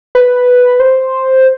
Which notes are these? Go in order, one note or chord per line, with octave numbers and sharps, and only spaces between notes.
B4
C5